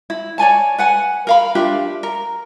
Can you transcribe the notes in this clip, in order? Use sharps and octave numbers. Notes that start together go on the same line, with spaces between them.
E4
C#5 D5 G#5 A5
B4 F#5 G#5
A#4 F5 B5
D4 F4 G4 E5
A#4